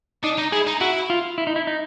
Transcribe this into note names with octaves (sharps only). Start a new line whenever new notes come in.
D4 D#4
D#4
E4 G#4
D#4
E4 F#4
F4
E4
D#4
E4
D#4